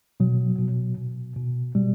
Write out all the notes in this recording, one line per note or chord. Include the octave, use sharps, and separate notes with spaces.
B2 F#3
B2
B2
B2
B2 G3